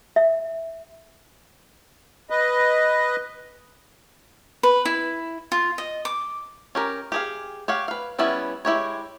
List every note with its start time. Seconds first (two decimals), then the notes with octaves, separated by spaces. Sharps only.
0.16 E5
2.30 B4 D#5
4.63 B4
4.85 E4
5.52 F4
5.78 D#5
6.05 D6
6.75 C#4 G4 A#4
7.12 G4 G#4 F5
7.68 G4 C#5 F5 F#5
7.88 B4 F5
8.19 G3 B3 C#4 E4 D5
8.65 G#3 E4 G4 C#5